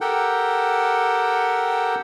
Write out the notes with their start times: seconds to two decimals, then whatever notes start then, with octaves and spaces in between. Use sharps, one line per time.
0.01 G4 A4 A#4 F#5 G5